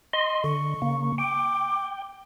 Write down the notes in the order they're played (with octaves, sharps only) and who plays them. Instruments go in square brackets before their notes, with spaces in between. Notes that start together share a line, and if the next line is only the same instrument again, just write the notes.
[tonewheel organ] D#5 C6
[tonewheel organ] D3 [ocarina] C#6
[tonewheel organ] C#3 A#3
[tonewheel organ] G5 [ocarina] D6